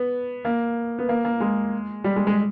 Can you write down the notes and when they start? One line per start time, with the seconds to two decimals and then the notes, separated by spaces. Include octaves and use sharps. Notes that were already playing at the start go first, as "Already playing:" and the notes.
Already playing: B3
0.45 A#3
0.99 B3
1.09 A#3
1.25 A#3
1.40 G#3
2.04 G3
2.16 G#3
2.27 G#3